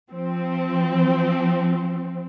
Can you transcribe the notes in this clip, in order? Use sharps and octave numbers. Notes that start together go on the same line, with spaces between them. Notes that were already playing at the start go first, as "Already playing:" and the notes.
F3 C4